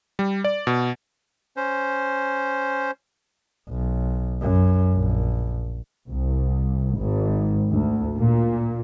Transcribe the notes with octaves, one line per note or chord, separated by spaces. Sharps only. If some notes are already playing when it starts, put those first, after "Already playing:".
G3
D5
B2
C#4 C5
B1
F#2
A#1
C2
G#1
D2
A#2